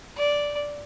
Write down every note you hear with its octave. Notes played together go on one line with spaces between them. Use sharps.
D5